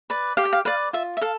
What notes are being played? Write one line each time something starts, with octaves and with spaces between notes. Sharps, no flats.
B4 D5
G4 F5
G5
F5
B4 D5 F5
F4 E5
E5
A4 F5